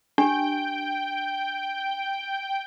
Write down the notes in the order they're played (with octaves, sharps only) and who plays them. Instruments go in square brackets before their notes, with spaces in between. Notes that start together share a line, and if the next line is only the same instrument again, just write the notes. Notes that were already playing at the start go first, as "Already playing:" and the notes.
[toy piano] D4 G4 [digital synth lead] G5